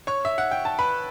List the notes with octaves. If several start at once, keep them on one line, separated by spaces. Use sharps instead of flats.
C#5 C#6
E5
F#5
G5
A5
B4 B5